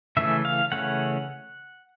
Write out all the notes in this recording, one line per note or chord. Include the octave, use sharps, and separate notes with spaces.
C#3 E3 A3 C#4 E5
F5
C#3 E3 A3 C#4 F#5